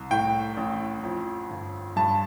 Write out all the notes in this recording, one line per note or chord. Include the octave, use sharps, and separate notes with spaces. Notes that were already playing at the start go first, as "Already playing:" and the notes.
Already playing: C2
A2 G5
A1
F2
G1
G2 A5